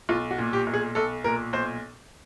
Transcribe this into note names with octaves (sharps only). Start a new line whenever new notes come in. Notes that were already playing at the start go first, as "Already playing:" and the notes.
B1 F4
F#4
A#2
G4
B1
G#4
B1 A4
A#2 A#4
B1 C5